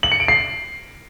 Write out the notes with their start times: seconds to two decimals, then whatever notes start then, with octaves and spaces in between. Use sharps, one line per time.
0.03 F#7
0.12 C#7
0.20 D7
0.28 C7